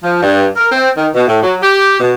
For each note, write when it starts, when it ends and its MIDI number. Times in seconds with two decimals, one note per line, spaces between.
0.03 0.22 53
0.23 0.46 43
0.57 0.68 70
0.72 0.88 60
0.97 1.09 51
1.14 1.25 47
1.28 1.40 45
1.43 1.56 54
1.61 1.99 67
2.00 2.13 47